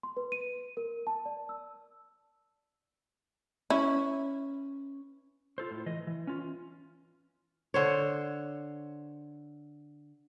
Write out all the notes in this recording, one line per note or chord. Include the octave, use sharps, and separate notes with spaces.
C6
B4
D#7
A#4
A5
D5
E6
C#4 E4 B4
F4 A4 C5
A2
E3 D#5
E3
C#4 F4
D3 C5 C#5